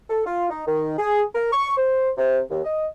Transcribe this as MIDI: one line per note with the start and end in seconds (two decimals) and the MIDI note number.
0.10 0.22 69
0.26 0.45 65
0.50 0.65 63
0.67 0.97 51
0.98 1.21 68
1.34 1.50 70
1.52 1.76 85
1.77 2.10 72
2.18 2.39 48
2.50 2.60 39
2.64 2.86 75